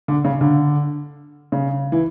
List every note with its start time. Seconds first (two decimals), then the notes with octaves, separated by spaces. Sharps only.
0.08 D3
0.25 C#3
0.41 D3
1.52 C#3
1.92 E3